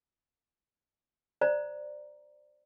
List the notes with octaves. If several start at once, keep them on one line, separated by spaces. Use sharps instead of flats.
C5 D5 A#5